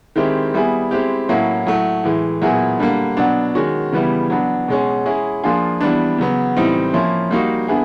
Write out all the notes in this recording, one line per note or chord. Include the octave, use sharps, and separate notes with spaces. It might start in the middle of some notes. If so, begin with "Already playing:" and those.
D#3 G#3 C4 E4 G4
G3 B3 E4 G#4
G#3 C4 E4 G4
A2 F#3 A#3 C#4 E4
A2 F#3 A3
A2 E3 G#3
A#2 F#3 B3 E4 G#4
D3 G3 A#3
B2 F#3 B3 D4
D#3 G#3 C#4 F#4
C#3 E3 G3 B3 E4
F#3 B3 D4
B2 G#3 C#4
G#3 C#4 E4 G#4
F3 A#3 D4 F4 G#4
E3 G3 B3 D4
C#3 F#3 B3
A2 E3 G3 C4 D#4
F3 A#3 C#4 E4
G3 A#3 D#4 F#4
D3 B3 E4 G#4